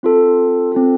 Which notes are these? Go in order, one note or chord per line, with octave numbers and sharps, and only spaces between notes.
C4 F4 A4
C4 F4 A4